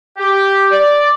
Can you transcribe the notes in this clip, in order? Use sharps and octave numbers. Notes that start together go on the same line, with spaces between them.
G4
D5